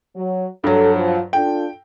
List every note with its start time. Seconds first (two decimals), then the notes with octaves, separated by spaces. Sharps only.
0.15 F#3
0.64 G2 F#3 A4
0.95 F3
1.33 D4 F4 A4 G5